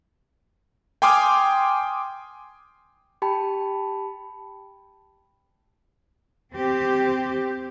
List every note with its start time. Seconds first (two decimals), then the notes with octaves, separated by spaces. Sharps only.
1.02 G5 G#5 C6 D6 D#6 F6
3.22 G4 G5 A5 B5
6.51 C4 G4